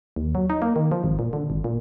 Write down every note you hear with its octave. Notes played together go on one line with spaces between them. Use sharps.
D#2
F#3
D#4
A#3
D#3
F3
G#1
A#2
D3
G#1
A#2